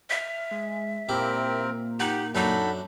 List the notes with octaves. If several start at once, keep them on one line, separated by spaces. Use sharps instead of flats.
E5 F6
G#3
A#2 A#3 C4 E4 G4 A#4
D#4 G4 F#5
F#2 D4 D#4 F#4 A4 B5